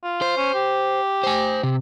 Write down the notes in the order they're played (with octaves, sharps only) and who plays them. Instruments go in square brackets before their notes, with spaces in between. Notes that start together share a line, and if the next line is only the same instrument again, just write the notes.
[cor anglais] F4
[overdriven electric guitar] C5
[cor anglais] C#4
G4
[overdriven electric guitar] C5 G#5
C3